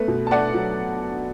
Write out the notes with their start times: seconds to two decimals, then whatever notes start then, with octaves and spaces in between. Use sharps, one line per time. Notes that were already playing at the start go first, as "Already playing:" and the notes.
Already playing: A3 B3 B4
0.08 B2
0.27 A5
0.31 A3 D5 F#5
0.54 F#3